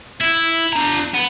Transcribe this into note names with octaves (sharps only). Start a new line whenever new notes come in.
E4
D4 A#5
B3